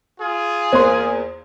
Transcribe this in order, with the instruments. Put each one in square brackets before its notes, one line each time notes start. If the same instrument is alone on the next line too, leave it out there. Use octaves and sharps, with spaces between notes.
[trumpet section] F4 G#4
[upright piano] E2 A#3 [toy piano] C5 C6